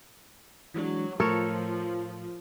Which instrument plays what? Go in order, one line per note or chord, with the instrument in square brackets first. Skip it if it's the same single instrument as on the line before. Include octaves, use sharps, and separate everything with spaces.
[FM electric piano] E3 G#3 D4 [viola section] F#3
[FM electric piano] A2 A3 [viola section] F3 [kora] A4 A#4 C#5